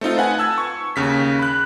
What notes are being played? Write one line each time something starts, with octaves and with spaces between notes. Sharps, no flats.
A3 C4 D#4 F4
B4 F#5 G#5
A5 E6 G#6
C#6
D#2 C#3 B6
B5 F#6